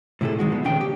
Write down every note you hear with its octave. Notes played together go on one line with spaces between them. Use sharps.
A2 C3 E4 G#4 A4
G2 D#3 G#3 F#4
F3 B3
D#2 A#2 C#3 D4 G5
G4